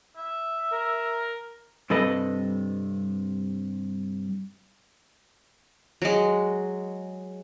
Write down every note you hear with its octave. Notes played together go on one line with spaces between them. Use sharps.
E5
A#4
G2 C3 A4 B4 D#5 B5
F#3 G#3